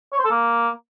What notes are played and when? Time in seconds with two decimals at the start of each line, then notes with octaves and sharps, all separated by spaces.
0.12 C#5
0.18 C5
0.25 A4
0.31 A#3